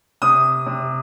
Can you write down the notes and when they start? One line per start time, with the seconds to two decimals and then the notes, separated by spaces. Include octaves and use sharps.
0.22 C3 D#6
0.66 C3